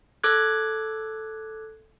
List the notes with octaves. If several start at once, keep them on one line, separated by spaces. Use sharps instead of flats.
A4 D6 F#6 G#6